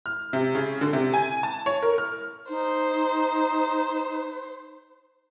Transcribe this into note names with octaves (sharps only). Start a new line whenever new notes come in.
F6
C3
C#3
D3
C3
G#5
A5
C#5
A#4
F6
D#4 C5